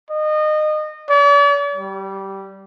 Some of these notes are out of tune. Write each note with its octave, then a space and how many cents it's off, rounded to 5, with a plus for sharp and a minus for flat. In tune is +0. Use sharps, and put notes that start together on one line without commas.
D#5 -25
D5 -45
G3 -15